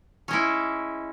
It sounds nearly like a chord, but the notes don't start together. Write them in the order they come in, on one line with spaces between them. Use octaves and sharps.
C#4 G#3 E4